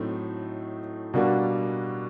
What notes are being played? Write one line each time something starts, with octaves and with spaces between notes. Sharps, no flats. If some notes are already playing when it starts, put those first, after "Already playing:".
Already playing: A2 F#3 A3 C4 D#4
B2 G3 A#3 D4 F#4